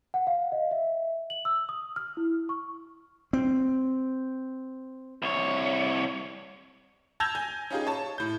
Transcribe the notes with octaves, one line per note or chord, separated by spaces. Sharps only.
F#5
F5
D#5
E5
F#7
E6
D#6
F6
E4
C#6
C4
C2 C#5
A5 E6 G6 G#6 A#6 F7
G#5 G6
C#4 D#4 F4 G4 G#4
C#5 A5
A2 G6